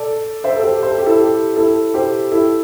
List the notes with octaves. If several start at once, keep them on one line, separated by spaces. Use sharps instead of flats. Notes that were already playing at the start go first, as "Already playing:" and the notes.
Already playing: A4 D5
C5 E5
A4
G4 C5
C5
A4
G4
E4 A4
G4
E4 A4
G4 C5
E4 A4